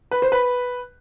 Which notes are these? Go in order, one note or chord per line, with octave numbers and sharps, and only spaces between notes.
B4
C5
B4